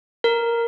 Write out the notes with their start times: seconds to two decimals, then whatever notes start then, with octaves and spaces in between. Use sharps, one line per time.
0.24 A#4